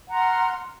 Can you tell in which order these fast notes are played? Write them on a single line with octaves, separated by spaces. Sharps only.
F#5 A#5 C6 F6